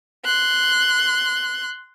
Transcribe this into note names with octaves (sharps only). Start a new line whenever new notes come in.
C6 F#6